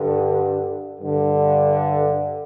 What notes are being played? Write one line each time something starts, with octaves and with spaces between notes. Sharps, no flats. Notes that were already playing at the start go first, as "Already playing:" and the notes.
Already playing: G2 D3
G2 D3